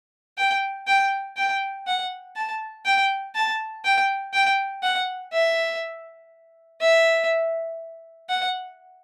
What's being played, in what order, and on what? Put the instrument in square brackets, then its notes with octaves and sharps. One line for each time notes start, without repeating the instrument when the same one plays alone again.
[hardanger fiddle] G5
G5
G5
F#5
A5
G5
A5
G5
G5
F#5
E5
E5
F#5